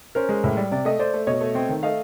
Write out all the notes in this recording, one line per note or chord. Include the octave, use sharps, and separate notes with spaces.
C#4 A#4 C5
G#3
A2
G3
C3 D5
A3 D#5
A3 C5 D5
A3
B2 C#5 D#5
A3
C4
D#3
A3 D#5 F5